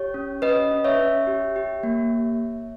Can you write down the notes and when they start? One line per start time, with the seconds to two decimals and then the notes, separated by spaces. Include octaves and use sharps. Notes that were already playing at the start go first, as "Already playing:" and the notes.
Already playing: G4 C#5
0.14 C#4
0.42 C#4 B4 D#5
0.71 C#4
0.84 C#5 E5
0.99 C#4
1.27 G4
1.56 G4
1.83 A#3